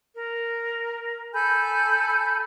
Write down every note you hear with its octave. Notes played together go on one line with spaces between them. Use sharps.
A#4
A4 G#5 B5 G6